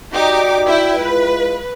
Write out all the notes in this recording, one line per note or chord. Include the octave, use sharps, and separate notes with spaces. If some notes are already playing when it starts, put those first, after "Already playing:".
D#4 F#4 G4 D5 D6
E4 E5 G5
G#3 E4 F4 B4